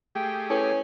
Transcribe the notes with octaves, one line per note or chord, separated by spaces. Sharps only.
A3 G4 G#4 G5
C#4 E4 A4 B4